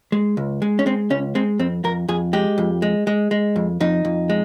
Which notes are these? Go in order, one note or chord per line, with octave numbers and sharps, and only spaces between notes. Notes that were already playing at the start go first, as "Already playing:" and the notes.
G#3
C#2
G#3
C#4
G#3 C4
C#2 C#4
G#3 C4
F2 C4
F2 A#4
F2 G#4
G#3 G4
F2
G#3
G#3
G#3
F2
F2 D#4
F2
G#3